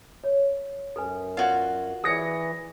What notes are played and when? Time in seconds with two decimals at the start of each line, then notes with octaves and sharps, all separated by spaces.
0.24 C#5
0.96 F#2 A4 B4 G#5
1.37 F4 F#4 B4 D5
2.04 E3 G#4 D5 D#6 A#6 C#7